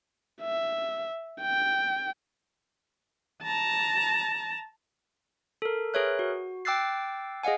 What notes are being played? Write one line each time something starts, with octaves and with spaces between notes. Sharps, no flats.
E5
G5
A5 A#5
A4 A#4
G#4 A#4 B4 C#5 E5 F#6
F#4
G5 D6 E6 F#6 A6 C7
G#4 D#5 F5 F#5 G#5